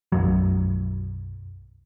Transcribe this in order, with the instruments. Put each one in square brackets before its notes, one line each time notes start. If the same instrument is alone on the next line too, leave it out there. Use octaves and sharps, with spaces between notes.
[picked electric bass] B1 F#2 F#3